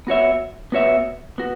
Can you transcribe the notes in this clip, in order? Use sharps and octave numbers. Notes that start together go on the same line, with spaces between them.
B3 F#4 C#5 E5
B3 F#4 C#5 E5
B3 F#4